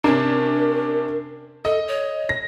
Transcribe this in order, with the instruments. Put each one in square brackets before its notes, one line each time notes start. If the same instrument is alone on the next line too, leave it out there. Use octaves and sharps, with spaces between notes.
[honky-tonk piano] C3 C#4 D4 [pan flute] A#4
[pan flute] A4 [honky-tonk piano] D#5
[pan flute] C#5
[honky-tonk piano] A#6